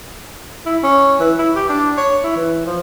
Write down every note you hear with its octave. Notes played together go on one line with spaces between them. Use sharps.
E4
C#4
E3
E4
G4
D4
C#5
E4
E3
F3